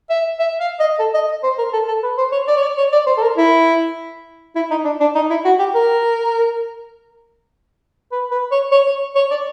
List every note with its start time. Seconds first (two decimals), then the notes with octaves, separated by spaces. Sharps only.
0.10 E5
0.39 E5
0.60 F5
0.80 D#5
0.99 A4
1.14 D#5
1.43 C5
1.58 A#4
1.73 A4
1.88 A4
2.03 B4
2.18 C5
2.32 C#5
2.48 D5
2.57 C#5
2.63 D5
2.78 C#5
2.92 D5
3.06 C5
3.17 A4
3.22 A#4
3.37 E4
4.56 E4
4.71 D#4
4.84 D4
5.00 D4
5.15 D#4
5.30 E4
5.45 F#4
5.59 G4
5.75 A#4
8.12 B4
8.31 B4
8.51 C#5
8.72 C#5
8.87 C#5
9.15 C#5
9.31 D5